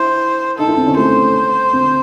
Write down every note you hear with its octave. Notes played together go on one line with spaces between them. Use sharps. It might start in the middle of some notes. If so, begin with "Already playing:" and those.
Already playing: E4 C5
D#4 A4
E4
C4
C#4
A3 C5
C4